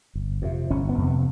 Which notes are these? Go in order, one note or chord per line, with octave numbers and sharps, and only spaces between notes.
G1
F2 C3
G1 C#4
B3
F2 C3
B3